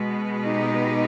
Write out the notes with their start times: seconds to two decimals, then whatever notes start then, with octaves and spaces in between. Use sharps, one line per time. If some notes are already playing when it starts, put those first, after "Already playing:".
Already playing: B2 G#3 B3
0.42 D#4 G4